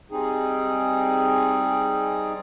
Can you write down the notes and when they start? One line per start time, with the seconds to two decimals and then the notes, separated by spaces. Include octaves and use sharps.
0.11 G3 C4 D#4 G#4